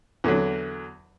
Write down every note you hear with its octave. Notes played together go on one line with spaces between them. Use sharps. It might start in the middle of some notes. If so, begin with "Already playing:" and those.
E2 D3 F#3